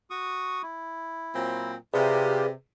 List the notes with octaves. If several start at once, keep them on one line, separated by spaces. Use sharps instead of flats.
F#4 C#6 D#6
E4
A#2 F#3 C4
C3 F4 G4 G#4 B4 D5